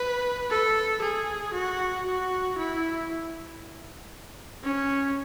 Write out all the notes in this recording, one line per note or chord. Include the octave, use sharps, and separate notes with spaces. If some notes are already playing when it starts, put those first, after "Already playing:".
Already playing: B4
A4
G#4
F#4
F#4
E4
C#4